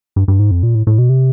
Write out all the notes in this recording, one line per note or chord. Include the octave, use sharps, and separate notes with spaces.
G2
G2
G#2
F2
A#2
A2
A2
B2
C3